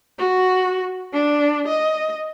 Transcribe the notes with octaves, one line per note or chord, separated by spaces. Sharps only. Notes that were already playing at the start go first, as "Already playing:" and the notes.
F#4
D4
D#5